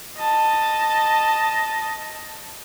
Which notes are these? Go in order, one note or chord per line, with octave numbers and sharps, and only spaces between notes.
D#5 A5